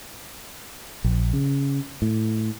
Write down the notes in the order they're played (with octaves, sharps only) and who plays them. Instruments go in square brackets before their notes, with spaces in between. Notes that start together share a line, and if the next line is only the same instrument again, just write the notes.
[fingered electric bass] A#1
C#3
A2